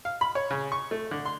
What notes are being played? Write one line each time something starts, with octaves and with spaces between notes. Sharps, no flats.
F5
B5
C#5
C#3
C#6
A3
D3
C6